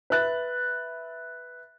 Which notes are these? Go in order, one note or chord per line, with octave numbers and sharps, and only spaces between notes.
B4 E5 F#6 A6